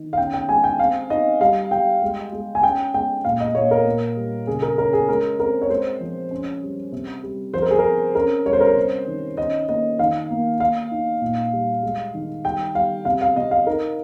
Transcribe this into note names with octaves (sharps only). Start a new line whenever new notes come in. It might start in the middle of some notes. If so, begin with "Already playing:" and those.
Already playing: D#3
F5
C#4 G5
G5
G#3 G#5
G5
C4 F5
D#4 D#5
G3 F5
G3 G5
G#3
G#3
G#5
C#4 G5
G#3 G5
A#2 F5
D#5
A#2 C#5
A#4
A#2
G3
C#3 G#4
A#4
C#4 A#4
G#4
G#3 A#4
C4 A#4
C#5
G#3 C5
F3
C#4
G3
C3
G3
F3 C5
A#4
G#4
A#4
C4
C#4 A#4
G3 C#5
C5
A#4
C5
C3
D#3
C#4 D#5
A#3 D#5
D#3 F5
A#3
A#3 F5
D#4
A#2
G3
G#3
D#3
G3 G5
G3 F5
C3 F5
F5
C3 D#5
F5
D#4 A#4